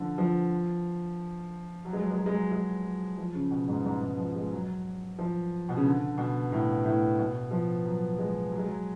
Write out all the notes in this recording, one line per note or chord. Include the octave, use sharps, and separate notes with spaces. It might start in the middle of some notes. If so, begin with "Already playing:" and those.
Already playing: D3 F3
F3
F#3
G#3
F#3
G#3
F#3
G#3
F#3
G#3
F#3
F3
C#3
B2
G#2
G#2
G#2
F3
G#3
F#3
F3
B2
C#3
D3
B2
A2
A2
B2
F3
F#3
G#3
F#3
G#3
F#3